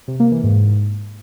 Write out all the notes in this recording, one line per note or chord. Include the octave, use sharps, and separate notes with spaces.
C3
A#3
E3
G#2